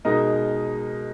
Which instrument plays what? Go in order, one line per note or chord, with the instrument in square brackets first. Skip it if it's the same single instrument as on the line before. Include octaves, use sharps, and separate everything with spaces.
[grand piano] B2 G#3 D#4 A#4 D#5